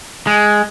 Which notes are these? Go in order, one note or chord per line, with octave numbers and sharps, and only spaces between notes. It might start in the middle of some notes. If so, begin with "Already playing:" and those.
G#3